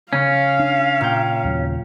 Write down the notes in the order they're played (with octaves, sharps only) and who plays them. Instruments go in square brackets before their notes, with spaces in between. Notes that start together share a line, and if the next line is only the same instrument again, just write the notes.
[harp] C#3 [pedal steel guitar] C#4 [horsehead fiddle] F5
[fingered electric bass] D4
[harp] A#2 G5
[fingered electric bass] D#2 C#3 F#3